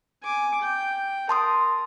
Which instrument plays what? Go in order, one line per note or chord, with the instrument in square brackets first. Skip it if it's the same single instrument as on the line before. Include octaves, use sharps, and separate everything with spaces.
[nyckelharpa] G#5 D6
G5
[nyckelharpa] A#4 [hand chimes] A5 C6 D#6